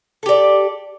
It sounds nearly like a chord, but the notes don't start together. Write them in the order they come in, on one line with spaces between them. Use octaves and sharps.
A4 G4 D5